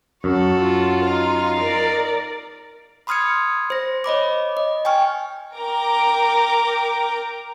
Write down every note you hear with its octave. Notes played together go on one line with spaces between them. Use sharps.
F#2 F#4 A4
F4
D#4 F5
A#4 D5
B5 C6 D#6 F6 G#6 C#7
C5 A#6
C#5 D#5 B5 D6
D#5
G5 G#5 C#6 F6
A#4 G5 A#5 D6